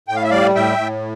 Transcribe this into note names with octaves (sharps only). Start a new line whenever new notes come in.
A2 G5
F5
E5
G3 D5 F5
A2 E5 G5
A2